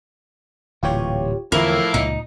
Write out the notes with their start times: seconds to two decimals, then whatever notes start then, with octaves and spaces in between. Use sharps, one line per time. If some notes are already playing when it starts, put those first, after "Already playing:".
0.83 D1 A#2 E3 F4 G4 C#5
1.52 E2 A2 D3 E3 F3 A#3 E4 A#4
1.94 C#2 A#2 D#4